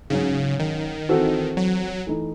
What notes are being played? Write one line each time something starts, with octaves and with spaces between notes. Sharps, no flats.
G#2 C#3 F#3 C#4
D#3
E3 C4 F#4 A4
F#3
E3 A3 D#4